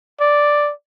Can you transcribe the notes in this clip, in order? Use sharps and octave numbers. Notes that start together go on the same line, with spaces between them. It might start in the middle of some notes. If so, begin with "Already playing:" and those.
D5